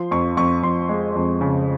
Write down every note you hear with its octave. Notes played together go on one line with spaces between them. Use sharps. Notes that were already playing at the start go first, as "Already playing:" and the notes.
Already playing: F3 C6
F2 C#6
F2 C#6
F2 C6
G#3
F2
C#3